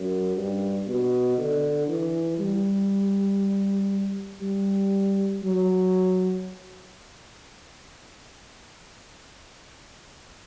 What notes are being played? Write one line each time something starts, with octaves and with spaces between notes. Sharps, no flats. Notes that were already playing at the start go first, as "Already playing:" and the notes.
Already playing: F#2
G2
B2
D3
E3
G3
G3
F#3